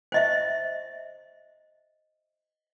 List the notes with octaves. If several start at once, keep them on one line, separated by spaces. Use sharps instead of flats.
C5 D#5 E5